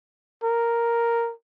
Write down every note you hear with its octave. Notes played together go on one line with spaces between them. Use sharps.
A#4